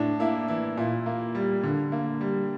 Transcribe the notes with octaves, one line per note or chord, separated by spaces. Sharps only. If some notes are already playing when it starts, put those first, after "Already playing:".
Already playing: A2 D4
A#3 E4
E3 E4
A#2 E4
A#3
G3
D3
A#3
G3